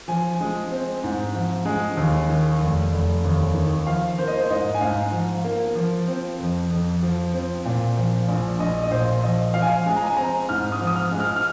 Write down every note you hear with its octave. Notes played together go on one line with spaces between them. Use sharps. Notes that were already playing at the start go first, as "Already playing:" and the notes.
F3 G#5
G#3
C4
G#2
F3
G#3
D#2
D#3
F1
F1
D#2
D#3
F3 F5
A#3 C5
D#5
C5
G#2 D#5
G#5
G#2 F5
F3
A#3
F3
C4
F2
F2
F3
C4
A#2
F3
A#1
A#1 D#5
D#5
A#2 C5
F3 D#5
F3 F5
G#5
F5
G#3 G#5
A#5
G#5
C4 A#5
G#2 F6
D#6
F3
D#6
F6
G#3
F6
F6